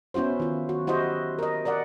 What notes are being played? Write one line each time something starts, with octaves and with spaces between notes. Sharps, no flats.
B3 C#4 E4 F#4 C5
D#3 F4
F#4
E4 F#4 G4 C5 D#5
A#4 D#5
A#4 D5 D#5 F#5